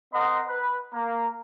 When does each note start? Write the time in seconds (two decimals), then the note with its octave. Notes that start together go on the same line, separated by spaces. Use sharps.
0.14 C4 A#4 D#5 F#5 C6 D#6
0.47 B4
0.94 A#3 A#5